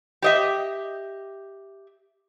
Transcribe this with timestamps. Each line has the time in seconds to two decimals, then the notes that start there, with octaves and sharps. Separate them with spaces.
0.22 G4 D#5 E5